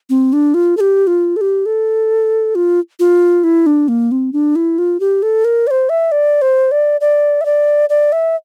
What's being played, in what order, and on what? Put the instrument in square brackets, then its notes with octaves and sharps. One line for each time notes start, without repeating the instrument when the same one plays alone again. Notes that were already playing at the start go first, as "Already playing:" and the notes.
[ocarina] C4
D4
F4
A4
G4
F4
A4
G4
A4
F4
F4
E4
D4
A#3
C4
D4
E4
F4
G4
A4
A#4
D5
C5
E5
D5
C5
D5
D5
E5
D5
D5
E5